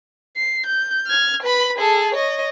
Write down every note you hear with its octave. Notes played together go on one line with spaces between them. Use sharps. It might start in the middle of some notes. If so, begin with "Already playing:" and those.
C7
G6
F6 G#6
B4 B5
G#4 A4
C#5 D#5